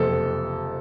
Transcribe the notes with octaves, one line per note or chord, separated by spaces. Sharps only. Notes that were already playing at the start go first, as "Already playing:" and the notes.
Already playing: F#1 F2 C3 A4